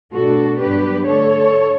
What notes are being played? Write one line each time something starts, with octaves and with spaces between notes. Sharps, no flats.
B2 A3 D4 F#4 A4
G2 F#3 B3 D4 G4 B4
D3 A3 D4 A4 C#5